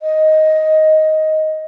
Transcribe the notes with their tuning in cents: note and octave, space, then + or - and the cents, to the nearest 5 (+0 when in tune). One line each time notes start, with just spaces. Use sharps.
D#5 +10